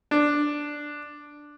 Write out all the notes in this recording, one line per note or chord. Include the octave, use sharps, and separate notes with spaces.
D4